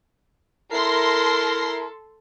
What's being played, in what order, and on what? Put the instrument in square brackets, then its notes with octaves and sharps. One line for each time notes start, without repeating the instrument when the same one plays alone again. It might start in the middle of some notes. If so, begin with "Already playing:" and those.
[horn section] E4 A#4 [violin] A4 [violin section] C6 A#6 C7